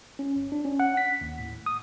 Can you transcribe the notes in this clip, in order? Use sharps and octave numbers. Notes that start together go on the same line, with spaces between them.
C#4
G1
D4
C#4
F#5
B6
D#2
A2
D#6